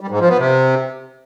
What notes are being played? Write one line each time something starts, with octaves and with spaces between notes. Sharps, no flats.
G3
G#2
F3
B3
C3